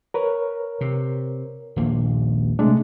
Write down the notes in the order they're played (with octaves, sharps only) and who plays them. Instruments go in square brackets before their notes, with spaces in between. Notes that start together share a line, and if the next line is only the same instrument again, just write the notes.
[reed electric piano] A#4 B4 C#5
[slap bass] C3
D#1 A#1 A#3
[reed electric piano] C3 G#3 D4 [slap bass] A3